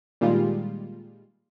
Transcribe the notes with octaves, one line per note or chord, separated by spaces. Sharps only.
A#2 D#3 G3 G#3 F4